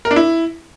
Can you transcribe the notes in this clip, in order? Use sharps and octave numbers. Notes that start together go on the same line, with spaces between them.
A#4
D4
E4